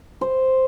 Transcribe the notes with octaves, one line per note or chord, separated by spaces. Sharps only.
C5